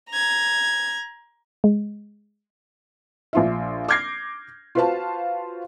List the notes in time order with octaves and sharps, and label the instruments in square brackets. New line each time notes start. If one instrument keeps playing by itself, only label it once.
[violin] A#5 G#6
[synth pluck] G#3
[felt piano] A#1 F4 E5
D6 F6 G6 G#6 A#6 C7
F4 F#4 B4 C5 F5 A5